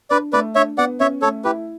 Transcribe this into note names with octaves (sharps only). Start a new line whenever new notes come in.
D4 B4 D5
A3 B4 D5
D4 C#5 E5
B3 D5 F#5
C#4 C#5 E5
A3 A4 C#5
E4 G4 B4